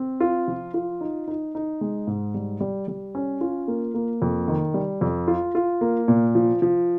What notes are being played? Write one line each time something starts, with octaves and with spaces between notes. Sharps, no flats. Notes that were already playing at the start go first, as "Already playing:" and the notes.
Already playing: C4
F4
F3
F4
D#4
D#4
D#4
G#3
G#2
G3
G3
G3
C#4
F4
A#3
A#3
F2
D#3
G3
F2
F4
F4
A#3
A#2
F3
F3